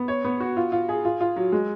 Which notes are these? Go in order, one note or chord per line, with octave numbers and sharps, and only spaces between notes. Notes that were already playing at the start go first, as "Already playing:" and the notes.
Already playing: B3
C#5
B3
F#4
F4
F4
G#4
F4
F4
F#3
G#3